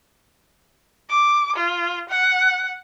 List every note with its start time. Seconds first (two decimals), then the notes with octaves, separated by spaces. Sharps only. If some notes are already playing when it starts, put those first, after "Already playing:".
1.09 D6
1.56 F4
2.09 F#5